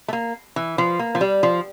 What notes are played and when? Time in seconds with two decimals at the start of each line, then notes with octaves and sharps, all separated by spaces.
0.08 A3
0.13 A#3
0.56 E3
0.78 F3
0.99 A#3
1.15 F3
1.21 G3
1.43 F3